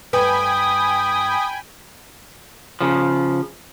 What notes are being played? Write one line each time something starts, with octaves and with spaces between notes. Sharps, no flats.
G2 B4 G5 G#5 B5 D#6
C#3 F3